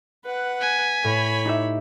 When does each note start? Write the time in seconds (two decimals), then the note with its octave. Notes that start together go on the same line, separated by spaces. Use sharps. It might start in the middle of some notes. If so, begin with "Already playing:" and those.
0.24 B4 F#5
0.61 G#5 B6
1.04 A2 C#5 B5
1.45 D#4 G4 E5